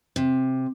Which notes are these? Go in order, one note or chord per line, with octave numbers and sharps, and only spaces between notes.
C3